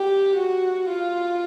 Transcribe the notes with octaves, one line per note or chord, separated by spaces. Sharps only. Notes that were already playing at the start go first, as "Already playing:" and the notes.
Already playing: G4
F#4
F4